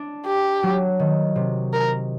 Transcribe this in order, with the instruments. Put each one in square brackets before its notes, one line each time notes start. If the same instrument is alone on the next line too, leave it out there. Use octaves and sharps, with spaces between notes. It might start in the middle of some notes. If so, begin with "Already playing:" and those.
Already playing: [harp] D4
[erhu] G4
[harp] F#3
D#3
C3
[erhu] A#4